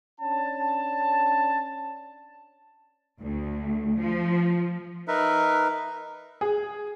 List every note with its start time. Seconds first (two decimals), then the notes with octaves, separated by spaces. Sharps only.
0.20 C#4 D4 A5
3.20 D2
3.99 F3
5.08 D#4 A#4 B4 E5
6.41 G#4